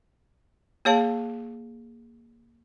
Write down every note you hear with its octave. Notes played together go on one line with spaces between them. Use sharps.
A#3 G#4 C#5 F5 A5